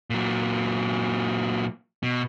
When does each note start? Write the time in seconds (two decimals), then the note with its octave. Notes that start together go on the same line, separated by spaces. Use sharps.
0.10 A#2 F#3
2.03 B2